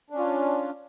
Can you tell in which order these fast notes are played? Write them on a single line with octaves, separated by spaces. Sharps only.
D4 C#4 F4